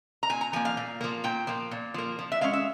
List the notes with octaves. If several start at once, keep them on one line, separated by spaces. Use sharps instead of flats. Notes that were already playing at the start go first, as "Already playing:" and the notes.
A#5
A#2 G#5
A#5
F3 A#3 G#5
F5
A#2
F3 A#3
A#2 G5
F3 A#3
A#2
F3 A#3
F3
E5
G#3 C#4 F5
E5